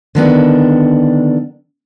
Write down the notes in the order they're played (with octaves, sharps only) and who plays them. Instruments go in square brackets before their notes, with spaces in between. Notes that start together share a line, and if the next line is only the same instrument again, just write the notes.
[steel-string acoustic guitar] D3 D#3 B3 D4